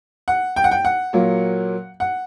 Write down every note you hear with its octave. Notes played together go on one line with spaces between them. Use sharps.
F#5
G5
F#5
G5
F#5
A#2 F#3 A#3
F#5